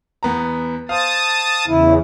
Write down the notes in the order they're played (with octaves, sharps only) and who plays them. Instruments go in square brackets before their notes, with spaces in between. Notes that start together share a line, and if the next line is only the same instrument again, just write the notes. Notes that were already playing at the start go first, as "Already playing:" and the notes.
[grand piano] E2 B3 A#5
[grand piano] C5 F5 [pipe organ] A5 D#6
[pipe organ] E2 C#3 [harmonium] E4